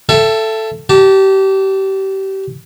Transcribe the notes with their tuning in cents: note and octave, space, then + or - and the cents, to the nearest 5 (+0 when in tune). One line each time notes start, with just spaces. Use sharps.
A4 +0 E5 +25 G5 +0
G4 -25 A5 +10